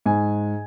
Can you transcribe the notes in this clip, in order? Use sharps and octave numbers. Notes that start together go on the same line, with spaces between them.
G#2 G#5